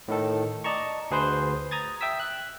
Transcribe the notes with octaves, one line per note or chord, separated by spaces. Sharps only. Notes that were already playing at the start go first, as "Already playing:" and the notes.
A2 D#3 A4
D5 D#5 A5 A#5 C#6
D2 G#4 B4 C5 C6 G6
A#5 D#6 G#6 A6
E5 G5 D#6 E6 B6
F#6